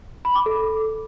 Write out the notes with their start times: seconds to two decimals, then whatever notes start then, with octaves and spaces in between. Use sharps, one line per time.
0.25 B5
0.35 D6
0.46 A4